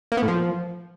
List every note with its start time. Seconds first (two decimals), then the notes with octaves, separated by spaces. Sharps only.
0.12 A#3
0.17 B3
0.23 A2
0.28 F3